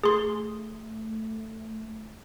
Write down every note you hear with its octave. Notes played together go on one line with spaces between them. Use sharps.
A3 G#4 C6